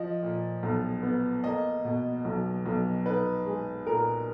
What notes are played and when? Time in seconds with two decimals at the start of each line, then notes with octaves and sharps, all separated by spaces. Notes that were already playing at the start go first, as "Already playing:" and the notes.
Already playing: F3 D#5
0.23 A#2
0.63 B1
1.03 B3
1.44 A#3 D#5
1.85 B2
2.25 B1
2.66 B1
3.06 D#4 B4
3.46 G#3
3.87 A#2 A#4